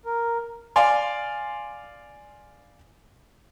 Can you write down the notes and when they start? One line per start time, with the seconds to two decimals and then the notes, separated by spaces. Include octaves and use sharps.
0.05 A#4
0.76 D5 F5 G#5 C6